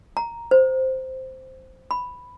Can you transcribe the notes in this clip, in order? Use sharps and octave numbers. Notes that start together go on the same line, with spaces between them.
A#5
C5
B5